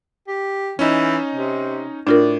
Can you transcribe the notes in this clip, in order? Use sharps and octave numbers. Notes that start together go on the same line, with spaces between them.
G4
E3 C#4 D#4
C3
A2 D4 F4 A#4 D5